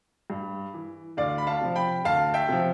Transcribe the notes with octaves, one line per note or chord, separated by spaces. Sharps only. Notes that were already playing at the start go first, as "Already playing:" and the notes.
G2
E3
D2 D5 F5
B5
F5 A5
C3 F3
G5 B5
D2 F5 A5
E5 G5
C3 F3